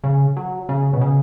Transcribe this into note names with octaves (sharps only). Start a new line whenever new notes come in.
C#3
F#3
C#3
B2
C#3